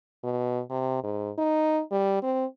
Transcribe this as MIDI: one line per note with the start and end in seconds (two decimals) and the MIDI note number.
0.24 0.61 47
0.70 1.02 48
1.04 1.30 44
1.38 1.82 63
1.91 2.20 55
2.23 2.45 60